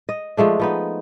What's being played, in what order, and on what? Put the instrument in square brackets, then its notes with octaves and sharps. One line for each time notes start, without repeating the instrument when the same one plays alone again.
[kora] D#5
F3 G#3 A3 D4
F3 B3 D#4